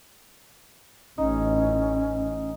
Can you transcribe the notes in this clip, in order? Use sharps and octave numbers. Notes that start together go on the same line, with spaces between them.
A1 C#4 D#4